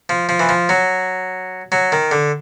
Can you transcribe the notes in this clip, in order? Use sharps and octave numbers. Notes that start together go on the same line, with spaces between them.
F3
F3
E3
F3
F#3
F#3
D#3
D3